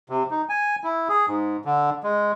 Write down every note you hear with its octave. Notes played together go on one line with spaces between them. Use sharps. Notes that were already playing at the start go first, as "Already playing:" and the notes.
C3
D#4
G#5
E4
G#4
G#2
D3
G#3